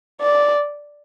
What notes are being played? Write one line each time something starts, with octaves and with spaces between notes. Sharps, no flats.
D5